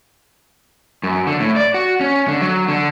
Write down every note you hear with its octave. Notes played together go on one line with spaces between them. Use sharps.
F#2
D3
A2
D5
F#4
C#4
D3
F#3
D3